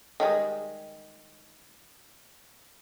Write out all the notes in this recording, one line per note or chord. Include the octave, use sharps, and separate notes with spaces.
D#3 G3 G#3